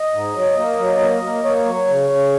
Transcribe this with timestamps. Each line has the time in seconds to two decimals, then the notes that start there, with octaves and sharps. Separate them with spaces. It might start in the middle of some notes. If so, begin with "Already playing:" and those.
Already playing: D#5
0.13 G#2
0.35 F#3
0.57 A#3
0.79 F#3
1.00 A#3
1.22 A#3
1.44 A#3 C#5
1.65 F#3
1.87 C#3
2.10 C#3